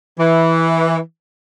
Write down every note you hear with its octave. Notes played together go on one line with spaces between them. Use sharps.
E3